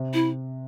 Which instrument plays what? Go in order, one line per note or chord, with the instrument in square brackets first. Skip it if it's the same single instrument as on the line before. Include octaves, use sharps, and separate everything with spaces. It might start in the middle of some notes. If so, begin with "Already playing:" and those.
Already playing: [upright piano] C3
[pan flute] E4